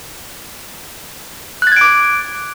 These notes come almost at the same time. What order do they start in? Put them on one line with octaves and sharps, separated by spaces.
F#6 A6 G#6 D7 D6